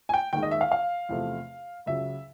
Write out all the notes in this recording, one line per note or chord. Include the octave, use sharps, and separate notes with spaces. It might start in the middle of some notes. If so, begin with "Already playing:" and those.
G#5
G5
D#2 D#3 G#3 G5
D#5
E5
F5
F5
E2 C3 F3 A3
C#2 C#3 F#3 E5